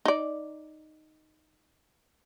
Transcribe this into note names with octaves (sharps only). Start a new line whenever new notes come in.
D#4 D5